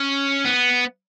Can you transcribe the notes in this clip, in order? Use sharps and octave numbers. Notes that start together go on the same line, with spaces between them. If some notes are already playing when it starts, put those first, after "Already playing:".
Already playing: C#4
B3